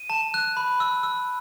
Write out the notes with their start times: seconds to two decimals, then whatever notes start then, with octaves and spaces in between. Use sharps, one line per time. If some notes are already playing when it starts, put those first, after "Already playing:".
Already playing: D#7
0.10 A5
0.34 F#6
0.57 B5
0.80 E6
1.03 E6